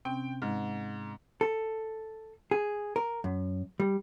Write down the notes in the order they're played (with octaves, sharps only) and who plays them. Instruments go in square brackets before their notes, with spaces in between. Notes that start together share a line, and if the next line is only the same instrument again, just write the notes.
[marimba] C3 C4 C#4 [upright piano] G5
[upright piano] G#2
[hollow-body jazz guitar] A4
G#4
A#4
F#2
G3